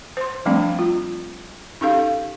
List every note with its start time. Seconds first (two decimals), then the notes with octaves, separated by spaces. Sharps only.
0.17 C5 C6
0.46 F3 G3 A3 C4 D4
0.79 F4
1.81 C#4 D#4 G4 A4 F5